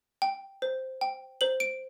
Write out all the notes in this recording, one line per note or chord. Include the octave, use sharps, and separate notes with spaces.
G5
C5
G5
C5 F#7
D7